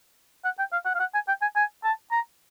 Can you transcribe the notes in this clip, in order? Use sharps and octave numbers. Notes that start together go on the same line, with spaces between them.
F#5
G5
F5
F#5
F5
F#5
G#5
G5
G#5
G#5
A5
A#5